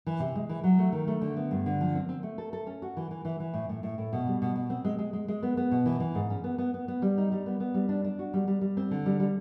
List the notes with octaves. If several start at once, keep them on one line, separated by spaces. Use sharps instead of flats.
E3
C3
G#3
E3
F#3
A3
D#3
A3
D3
B3
G2
D3
F3
C4
C4
A3
A4
A4
C#4
F#4
E3
E3
E3
E3
A2
A2
A2
A2
B2
G3
B2
B2
C4
G#3
G#3
G#3
G#3
B3
B3
B2
E3
E3
G#2
C#4
B3
B3
B3
B3
G3
D#4
G3
B3
B3
G3
D4
D4
F#4
G3
G3
G3
C4
D3
G3
G3